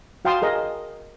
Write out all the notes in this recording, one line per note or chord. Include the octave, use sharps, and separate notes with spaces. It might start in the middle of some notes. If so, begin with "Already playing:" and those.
F#4 F5 G5 A5 C6 D#6
G#4 A#4 D#5